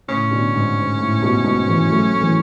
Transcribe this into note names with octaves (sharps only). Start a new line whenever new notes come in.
A2 C#3 C#4
B2 D3
G#2
G#2
A2
G#2 B2
G#2 B2
E3 G#3
F#3 A3
A3
E3 G#3